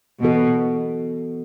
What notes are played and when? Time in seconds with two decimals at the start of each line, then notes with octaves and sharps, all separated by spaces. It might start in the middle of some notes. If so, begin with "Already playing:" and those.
0.23 B2 E3 B3 F#4 A4